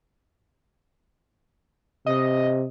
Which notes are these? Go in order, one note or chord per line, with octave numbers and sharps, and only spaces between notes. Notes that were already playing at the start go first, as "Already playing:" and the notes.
C3 D#5